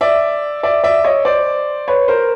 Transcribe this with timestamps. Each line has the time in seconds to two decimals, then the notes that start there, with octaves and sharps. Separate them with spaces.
0.01 D5 E5
0.63 D5 E5
0.84 D5 E5
1.04 C#5 D#5
1.25 C5 D5
1.88 B4 C#5
2.08 A#4 C5